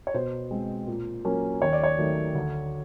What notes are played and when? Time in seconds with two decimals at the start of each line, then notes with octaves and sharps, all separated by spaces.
0.07 C#5
0.14 B2 C5
0.51 G#3 C4
0.87 A#2
1.25 F#3 A#3 C#4
1.62 D#2 C#5
1.73 D5
1.83 C#5
1.98 D#3 F#3 A3
2.35 D2